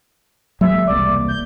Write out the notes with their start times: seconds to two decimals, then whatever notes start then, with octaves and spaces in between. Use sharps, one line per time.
0.61 F#3 G#3 A#3 E5
0.87 E1 C2 A#3 D5
1.28 G6